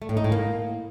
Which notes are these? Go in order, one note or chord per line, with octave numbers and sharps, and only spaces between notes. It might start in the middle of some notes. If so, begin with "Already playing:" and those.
A3
A2
D#4
A2
A#3